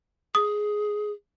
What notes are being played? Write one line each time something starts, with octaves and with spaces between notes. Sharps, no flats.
G#4 D#6